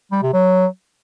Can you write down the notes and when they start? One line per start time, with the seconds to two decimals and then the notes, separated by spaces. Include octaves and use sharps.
0.12 G3
0.23 C3
0.33 F#3